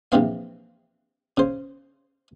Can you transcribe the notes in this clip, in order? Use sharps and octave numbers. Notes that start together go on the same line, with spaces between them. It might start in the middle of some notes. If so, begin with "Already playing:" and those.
A#1 C3 E3 C4 F5
C#3 C5